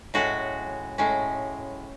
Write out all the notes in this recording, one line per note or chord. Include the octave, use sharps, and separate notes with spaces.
A2 G#3 C#4 F#4
A2 G#3 C#4